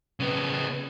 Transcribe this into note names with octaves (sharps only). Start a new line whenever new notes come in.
C#3 B3